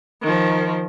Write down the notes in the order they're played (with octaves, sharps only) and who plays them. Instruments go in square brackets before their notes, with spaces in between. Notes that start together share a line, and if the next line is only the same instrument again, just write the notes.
[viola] D#3 F3